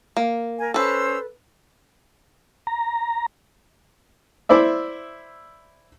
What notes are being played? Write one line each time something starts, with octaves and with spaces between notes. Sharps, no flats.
A#3
A#4 G#5
C#4 A4 B4 C5 E6
A#5
E4 C5 D5 E5